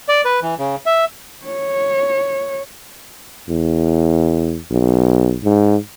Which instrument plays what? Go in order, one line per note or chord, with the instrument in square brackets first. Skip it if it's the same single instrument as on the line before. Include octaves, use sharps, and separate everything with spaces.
[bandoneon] D5
B4
E3
C#3
E5
[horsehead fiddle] C#5
[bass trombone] E2
B1
G#2